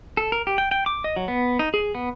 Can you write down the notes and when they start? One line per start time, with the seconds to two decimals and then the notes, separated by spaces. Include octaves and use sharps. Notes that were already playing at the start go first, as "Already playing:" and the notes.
0.17 A4
0.32 A#4
0.47 G4
0.58 G5
0.71 G5
0.86 D6
1.04 D#5
1.16 F#3
1.28 B3
1.59 D#4
1.74 G#4
1.95 B3